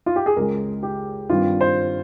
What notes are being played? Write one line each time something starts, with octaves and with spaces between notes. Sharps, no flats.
F4
G4
G#4
C#2 C#3 G#3 A#4
G4
G2 D#3 G3 C4 F4
C5